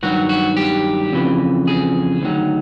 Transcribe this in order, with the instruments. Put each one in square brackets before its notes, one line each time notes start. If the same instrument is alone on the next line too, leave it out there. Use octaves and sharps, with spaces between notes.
[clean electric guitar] G2 D#3 F#3 F#4
F#4
G4
F2 C#3 E3
G#4
D2 C3 D#3 F#3